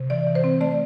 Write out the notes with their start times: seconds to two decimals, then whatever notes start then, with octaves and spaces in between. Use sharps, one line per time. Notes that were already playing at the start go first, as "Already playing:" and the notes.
Already playing: C3
0.10 E3 D5
0.27 E3
0.35 C5
0.44 C4
0.61 A3 D5